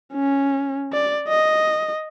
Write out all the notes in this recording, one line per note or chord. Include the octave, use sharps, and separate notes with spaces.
C#4
D5
D#5